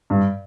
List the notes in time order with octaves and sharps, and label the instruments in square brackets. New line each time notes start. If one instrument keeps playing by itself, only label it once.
[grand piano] G2